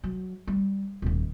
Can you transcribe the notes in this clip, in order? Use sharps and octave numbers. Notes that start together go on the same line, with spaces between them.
F#3
G3
D#1 D#2